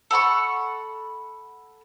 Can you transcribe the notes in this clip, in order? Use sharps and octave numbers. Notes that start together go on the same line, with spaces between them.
A4 F#5 B5 C#6